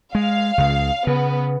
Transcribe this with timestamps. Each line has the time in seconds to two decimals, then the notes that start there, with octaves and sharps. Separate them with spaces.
0.15 G#3 F5
0.58 C#2 C#3
1.07 C#3 B3